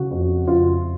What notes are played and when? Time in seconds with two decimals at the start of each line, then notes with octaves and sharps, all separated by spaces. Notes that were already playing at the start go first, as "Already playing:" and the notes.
Already playing: C#3 F#4
0.11 F2
0.47 F2 F4